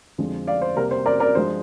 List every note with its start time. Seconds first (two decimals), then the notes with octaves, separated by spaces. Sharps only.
0.18 F2 D3 F3 G#3
0.47 D5 F5
0.62 C5
0.76 C2 C3 G3 A#3 A#4
0.91 C5
1.06 A#4 D5
1.20 A#4 D5
1.35 G2 F3 G#3 C5